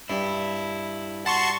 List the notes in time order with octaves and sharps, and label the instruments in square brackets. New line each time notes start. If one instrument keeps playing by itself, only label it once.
[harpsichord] G2 [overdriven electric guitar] E4
[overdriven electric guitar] F#4 F#5 [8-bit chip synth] A5 C6 C#6